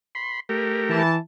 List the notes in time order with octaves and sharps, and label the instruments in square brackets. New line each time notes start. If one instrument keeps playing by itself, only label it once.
[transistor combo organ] B5 C6
A3 G4 A#4
[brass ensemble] E3 A5